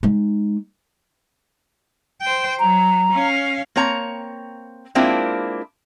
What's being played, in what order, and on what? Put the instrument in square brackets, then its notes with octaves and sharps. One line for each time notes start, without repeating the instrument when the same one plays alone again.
[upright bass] G#3 D#4
[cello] C5 G5
[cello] F#3 [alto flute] A#5
[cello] C#4 F5
[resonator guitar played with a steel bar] A#3 C4 C#5 A#5
G#3 A#3 C4 D4 E4 F4